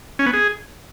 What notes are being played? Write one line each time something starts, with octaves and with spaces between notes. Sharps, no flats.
C#4
B3
G#4